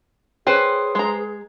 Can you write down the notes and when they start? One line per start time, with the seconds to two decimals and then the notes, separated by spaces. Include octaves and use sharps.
0.47 C#4 G#4 B4 C5 G5
0.95 G#3 A#5